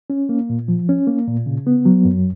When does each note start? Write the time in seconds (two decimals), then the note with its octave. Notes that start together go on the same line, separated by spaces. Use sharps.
0.10 C#4
0.29 A#3
0.49 A#2
0.68 F3
0.89 C#4
1.07 A#3
1.28 A#2
1.46 C#3
1.67 B3
1.86 F#3
2.05 F#2